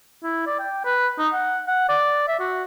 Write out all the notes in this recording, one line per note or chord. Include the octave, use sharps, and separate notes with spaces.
E4
D5
G5
B4
D#4
F#5
F#5
D5
E5
F#4